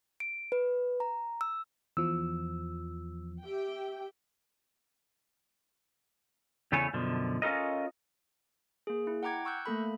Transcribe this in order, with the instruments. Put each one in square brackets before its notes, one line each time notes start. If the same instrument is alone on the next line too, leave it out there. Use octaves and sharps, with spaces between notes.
[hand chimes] D7
B4
A#5
E6
[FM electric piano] E2 F3 [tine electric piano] E6
[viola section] G4 E5 G5
[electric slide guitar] E2 C#3 A3 E4 C#5 G#5
F#2 B2 D3 F3
C#4 F4 A4 A#4 D#5
[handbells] A#3 G#4
E4
F#5 G5 A#5 D6 G#6
C#6 E6 F#6 G6
A3 A#3 A4 B5